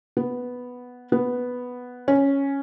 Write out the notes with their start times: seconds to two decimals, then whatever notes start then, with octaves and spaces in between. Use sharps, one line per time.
0.17 B3
1.12 B3
2.08 C#4